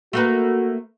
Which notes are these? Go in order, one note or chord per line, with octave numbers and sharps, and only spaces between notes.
A3 A#3 F#4 B4